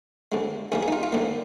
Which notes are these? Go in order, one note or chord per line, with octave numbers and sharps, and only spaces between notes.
D#2 D3 G#3
D#2 D#3 G3 A#3 G#4
G#4
D#4
F4
F4
D#2 D3 G3 A#3